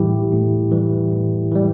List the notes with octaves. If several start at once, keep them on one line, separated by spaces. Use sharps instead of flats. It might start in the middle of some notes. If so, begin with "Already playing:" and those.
Already playing: A2 E3 G3 E4 G4
A2
E3 G3
A2
E3 G3